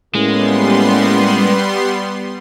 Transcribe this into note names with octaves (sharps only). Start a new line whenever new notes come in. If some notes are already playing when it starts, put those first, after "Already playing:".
A2 G3 G#3 A#3 B3 C#4 C6